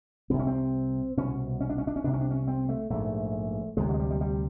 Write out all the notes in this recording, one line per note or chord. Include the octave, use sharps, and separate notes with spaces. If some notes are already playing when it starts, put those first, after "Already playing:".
C2 C3 C4
C#4
C4
C2 B2 C#4
C#4
D4
C#4
D4
C#4
C2 C3 D4
C#4
D4
C#4
C4
A3
A#1 G#2 A3
D2 C3 G#3
F#3
G#3
G3
G3
G3